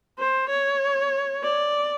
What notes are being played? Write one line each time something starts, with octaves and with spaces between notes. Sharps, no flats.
C5
C#5
D5